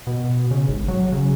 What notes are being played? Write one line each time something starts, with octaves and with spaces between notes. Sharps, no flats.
B2
C#3
G#1
F#3
C#3